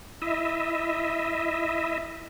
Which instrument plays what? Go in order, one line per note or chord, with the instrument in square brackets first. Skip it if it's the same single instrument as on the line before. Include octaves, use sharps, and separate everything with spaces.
[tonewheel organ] E4 D#5 E5